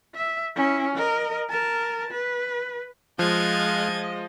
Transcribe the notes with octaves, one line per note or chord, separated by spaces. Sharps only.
E5
C#4 E4
A#4 D#5
A#4 A5
B4
F3 G#3 D#5 F5 F6 F#6 G#6 A6